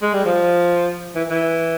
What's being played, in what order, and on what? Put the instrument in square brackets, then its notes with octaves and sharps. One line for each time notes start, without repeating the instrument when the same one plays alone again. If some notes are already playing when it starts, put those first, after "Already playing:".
[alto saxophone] G#3
G3
F3
E3
E3